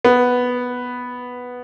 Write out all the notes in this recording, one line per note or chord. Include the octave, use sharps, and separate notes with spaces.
B3